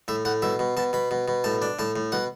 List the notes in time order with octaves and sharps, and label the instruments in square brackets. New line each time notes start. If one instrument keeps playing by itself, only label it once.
[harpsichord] A2 E5
A2 F#5
B2 E5
B2
B2 A5
B2 B5
B2
B2
A2 A5
D4
A2 A5
A2
B2 F#5